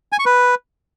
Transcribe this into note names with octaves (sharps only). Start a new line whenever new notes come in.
G#5
C#6
B4